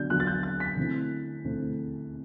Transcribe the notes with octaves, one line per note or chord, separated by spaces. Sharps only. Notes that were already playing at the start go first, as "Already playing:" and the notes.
Already playing: D3 F#3 B3 D4 G6
D3 F#3 B3 D4 F#6
A6
G6
A6
B6
D3 A3 C4 E4
D3 A3 C4 E4